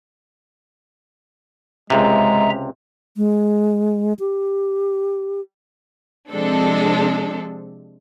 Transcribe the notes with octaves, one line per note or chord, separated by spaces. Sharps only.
C#2 C3 G#3 E5 A#5
G#3
G4
C3 F3 G#3 C4 D4 A4